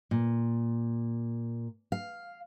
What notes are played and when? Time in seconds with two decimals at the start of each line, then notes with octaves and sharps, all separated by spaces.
0.11 A#2
1.92 F5